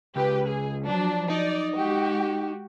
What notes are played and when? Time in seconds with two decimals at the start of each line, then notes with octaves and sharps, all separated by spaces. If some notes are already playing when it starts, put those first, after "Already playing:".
0.16 C#2 G4 B4
0.47 G#4
0.85 F3 F#3 D4
1.30 D#4 D5
1.75 G#3 F#4 G4